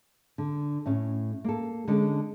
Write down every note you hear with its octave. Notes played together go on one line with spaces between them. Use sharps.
D3
A2 A3 C#4
A#3 A4
D3 G#3 C#4 A4